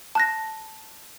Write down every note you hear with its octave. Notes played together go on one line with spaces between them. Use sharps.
A5 F#6 A#6